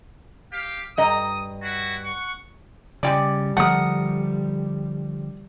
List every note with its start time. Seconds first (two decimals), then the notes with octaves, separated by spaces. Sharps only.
0.53 G4 F5
0.98 G2 D#5 A#5 D#6
1.63 E4 F#4
2.04 F#5 C#6
3.03 C#3 G3 G#3 G4 D5
3.57 D3 F3 A3 A#4 F#5 D#6